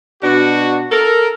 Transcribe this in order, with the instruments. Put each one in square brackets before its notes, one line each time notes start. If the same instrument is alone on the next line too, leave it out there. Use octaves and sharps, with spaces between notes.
[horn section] B2 D4 F#4
A4 A#4